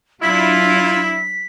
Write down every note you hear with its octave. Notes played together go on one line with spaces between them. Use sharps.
F#3 D4 E4 F4 B6